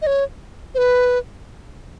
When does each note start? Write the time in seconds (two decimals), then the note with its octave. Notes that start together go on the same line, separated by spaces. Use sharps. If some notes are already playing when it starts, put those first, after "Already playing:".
0.02 D#5
0.07 C#5
0.75 C5
0.78 B4